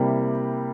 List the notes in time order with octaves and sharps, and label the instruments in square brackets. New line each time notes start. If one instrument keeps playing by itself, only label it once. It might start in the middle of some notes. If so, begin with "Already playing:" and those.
Already playing: [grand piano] C3 G3 A#3 E4